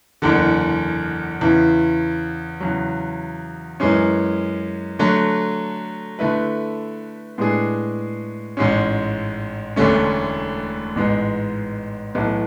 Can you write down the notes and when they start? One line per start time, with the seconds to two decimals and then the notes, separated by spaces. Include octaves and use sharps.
0.22 F#1 E2 D3
1.41 E2 C#3 E3
2.60 E2 C#3 F#3
3.80 F#2 E3 G#3 C#4
4.99 D3 F#3 A3
6.19 D3 A3 E4 B4
7.38 A2 G#3 B3 D4 G#4
8.57 A1 G#2 G#3 C#4
9.76 E1 D2 D3 A3 C#4
10.95 A1 G#2 G#3 B3
12.15 B1 A2 E3 B3